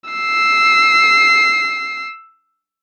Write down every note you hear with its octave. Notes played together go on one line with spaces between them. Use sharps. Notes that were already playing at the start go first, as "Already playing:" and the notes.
E6 C7